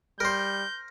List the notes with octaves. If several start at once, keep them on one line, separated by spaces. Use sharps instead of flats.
G3 A#4 C5 G6